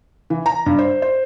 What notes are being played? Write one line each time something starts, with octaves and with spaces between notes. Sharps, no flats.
E3
A#5
G2
C5
C5